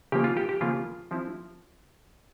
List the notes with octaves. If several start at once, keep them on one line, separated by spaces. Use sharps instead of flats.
C#3 F3 A#3 G4
F4
G4
G4
C#3 F3 A#3 F4
F3 C4 E4